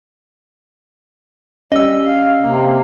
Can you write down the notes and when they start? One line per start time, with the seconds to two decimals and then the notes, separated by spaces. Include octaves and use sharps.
1.72 G3 C#4 D#5 E6
2.04 F5
2.42 C3 A#3